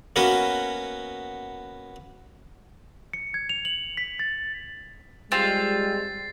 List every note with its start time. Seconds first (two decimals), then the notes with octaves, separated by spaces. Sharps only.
0.16 A#3 B3 C#4 F#4 B4
3.13 C#7
3.34 G#6
3.49 F7
3.65 F#7
3.97 B6
4.19 A6
5.32 G3 G#3 C4 F4 A6 C7